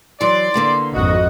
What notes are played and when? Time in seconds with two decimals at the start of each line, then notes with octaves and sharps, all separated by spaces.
0.21 E3 F#3 D5 C6
0.54 D3 A#3 B3
0.94 G#1 F2 F#4 D#5